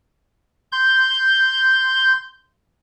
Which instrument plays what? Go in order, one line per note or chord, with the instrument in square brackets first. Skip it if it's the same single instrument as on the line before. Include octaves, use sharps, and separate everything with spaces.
[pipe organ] C6 G6